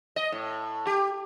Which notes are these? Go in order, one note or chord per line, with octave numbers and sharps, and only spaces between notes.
D#5
A2
G4